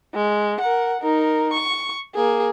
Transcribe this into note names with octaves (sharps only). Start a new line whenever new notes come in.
G#3
A#4 F#5
D#4 A#4
C#6
A#3 G#4